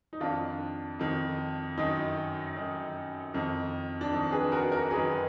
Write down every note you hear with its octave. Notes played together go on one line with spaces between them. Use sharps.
D#4
F2 D#3 D4 F4
F2 D#3
F#2 D#3 D#4
F#2 D#3
F2 D#3
D4
F2 D#3 D#4
G#4 B4
F#4 A#4
F#4 A#4
F#2 D#3 G#4 B4